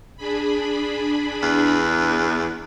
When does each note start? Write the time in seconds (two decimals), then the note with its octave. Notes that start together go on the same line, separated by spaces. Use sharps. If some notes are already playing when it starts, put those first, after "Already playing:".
0.17 D4 G#4 B5
1.43 E2